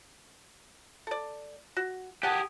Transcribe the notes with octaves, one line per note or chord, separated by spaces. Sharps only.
A4 D5
F#4
G4 G#4 F#5 G#5 A5